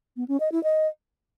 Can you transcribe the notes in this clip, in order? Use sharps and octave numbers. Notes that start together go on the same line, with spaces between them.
B3
C#4
D#5
E4
D#5